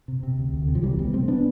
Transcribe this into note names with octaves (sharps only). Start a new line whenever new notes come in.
C3
C3
D2
D2
C3
F3
C2 E3 G3
C3 G3 B3
C3 A3 C4
B3 D4